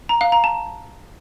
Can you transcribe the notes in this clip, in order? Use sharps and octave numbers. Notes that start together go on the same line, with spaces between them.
A#5
F5
A#5
A5